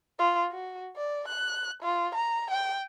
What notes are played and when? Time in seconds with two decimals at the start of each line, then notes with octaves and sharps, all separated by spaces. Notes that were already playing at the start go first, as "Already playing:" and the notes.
0.19 F4
0.51 F#4
0.97 D5
1.28 F#6
1.83 F4
2.15 A#5
2.50 G5